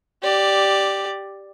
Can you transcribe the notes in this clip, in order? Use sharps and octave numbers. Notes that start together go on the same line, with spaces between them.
G4 D5